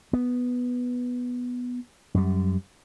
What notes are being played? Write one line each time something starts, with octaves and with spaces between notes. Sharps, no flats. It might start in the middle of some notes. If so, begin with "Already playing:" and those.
B3
F#2 G3